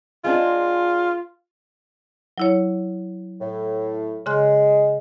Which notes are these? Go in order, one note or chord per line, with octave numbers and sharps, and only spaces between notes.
G#3 C4 D4 F4
F#3 E4 C#5
A2
C#3 G#3 C6 F#6